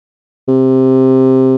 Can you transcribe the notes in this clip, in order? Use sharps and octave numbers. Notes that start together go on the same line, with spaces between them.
C3